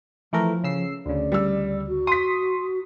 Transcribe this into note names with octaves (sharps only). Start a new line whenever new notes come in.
E3 F3 A3 A#4
C#3 E6 C7
D2 C#3 D5
G3 E6
F#4
C6 D#6 B6